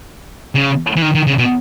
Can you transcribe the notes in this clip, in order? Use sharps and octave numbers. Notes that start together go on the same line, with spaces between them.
C#3
E3
D#3
D#3
C#3
B2